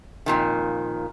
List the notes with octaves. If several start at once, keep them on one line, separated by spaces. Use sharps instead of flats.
F2 A#2 D#3